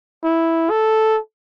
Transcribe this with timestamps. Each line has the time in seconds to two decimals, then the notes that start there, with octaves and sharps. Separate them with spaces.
0.24 E4
0.70 A4